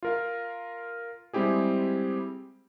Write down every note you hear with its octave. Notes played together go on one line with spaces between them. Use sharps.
F4 A#4 F5
G3 G#3 C4 E4 G4 G#4